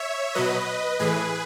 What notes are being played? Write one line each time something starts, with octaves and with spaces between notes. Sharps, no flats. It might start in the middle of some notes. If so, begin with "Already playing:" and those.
Already playing: C#5 E5
B2 F#3 B4 D#5
A2 E3 G#4 B4